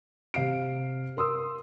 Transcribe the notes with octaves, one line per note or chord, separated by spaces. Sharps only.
C3 F5 C7 D7
A#4 C6 D#6 E6